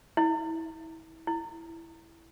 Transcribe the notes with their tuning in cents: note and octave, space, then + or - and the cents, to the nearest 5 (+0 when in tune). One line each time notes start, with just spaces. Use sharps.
E4 -30
E4 +5